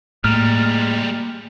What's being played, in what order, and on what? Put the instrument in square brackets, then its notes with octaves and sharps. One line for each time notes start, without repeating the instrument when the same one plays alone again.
[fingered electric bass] A2 [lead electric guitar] G3 G#3 [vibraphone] A#3 [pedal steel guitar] F6